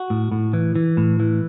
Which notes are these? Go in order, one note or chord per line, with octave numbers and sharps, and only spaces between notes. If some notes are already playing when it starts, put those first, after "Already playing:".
Already playing: F#4
A2
A2
E3
E3
A2
E3